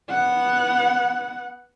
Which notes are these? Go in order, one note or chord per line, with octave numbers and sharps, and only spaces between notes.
B3 F#5